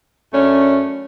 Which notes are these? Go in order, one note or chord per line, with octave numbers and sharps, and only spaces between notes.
F#2 A3 C#4 D4